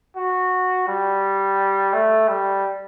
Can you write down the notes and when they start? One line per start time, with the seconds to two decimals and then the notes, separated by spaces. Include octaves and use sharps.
0.16 F#4
0.87 G3
1.93 A3
2.28 G3